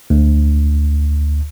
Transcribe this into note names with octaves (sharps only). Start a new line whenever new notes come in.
D2